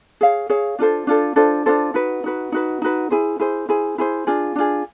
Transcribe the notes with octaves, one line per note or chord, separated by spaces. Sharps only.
G#4 C#5 F5
G#4 C#5 F5
D4 F4 A4 C5
D4 F4 A4 C5
D4 F4 A4 C5
D4 F4 A4 C5
D#4 F#4 B4
D#4 F#4 B4
D#4 F#4 B4
D#4 F#4 B4
E4 G#4 C5
E4 G#4 C5
E4 G#4 C5
E4 G#4 C5
D4 F4 G#4
D4 F4 G#4